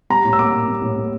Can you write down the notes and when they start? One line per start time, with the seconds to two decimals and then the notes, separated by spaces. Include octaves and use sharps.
0.10 G3 A#5
0.25 A2
0.33 E6
0.38 A#3 D6
0.53 A2
0.68 G3
0.82 A2
0.97 A#3